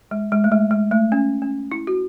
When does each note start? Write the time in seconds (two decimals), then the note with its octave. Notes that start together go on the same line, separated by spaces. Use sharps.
0.11 G#3
0.32 G#3
0.44 A3
0.52 G#3
0.71 G#3
0.91 A3
1.12 C#4
1.42 C#4
1.72 E4
1.87 F#4